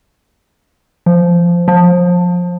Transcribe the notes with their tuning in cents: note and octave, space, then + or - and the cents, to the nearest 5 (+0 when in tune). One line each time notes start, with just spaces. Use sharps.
F3 -10
F3 +25